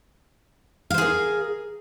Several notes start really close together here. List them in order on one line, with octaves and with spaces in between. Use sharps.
F5 C5 G#4 A#4